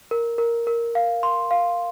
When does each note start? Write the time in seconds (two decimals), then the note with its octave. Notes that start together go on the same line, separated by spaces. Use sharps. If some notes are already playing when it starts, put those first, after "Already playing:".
0.11 A#4
0.38 A#4
0.67 A#4
0.95 F5
1.23 C6
1.51 F5